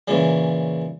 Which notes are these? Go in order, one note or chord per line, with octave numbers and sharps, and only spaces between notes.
A#2 C#3 E3